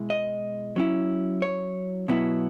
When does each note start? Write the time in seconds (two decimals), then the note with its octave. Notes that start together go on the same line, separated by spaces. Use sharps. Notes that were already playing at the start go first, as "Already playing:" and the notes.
Already playing: B2 G#3 E4
0.10 D#5
0.76 F#3 C#4 E4
1.42 C#5
2.08 B2 F#3 B3 E4